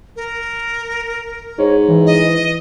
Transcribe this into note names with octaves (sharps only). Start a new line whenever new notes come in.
A#4
G#2 C#5
E3
D#5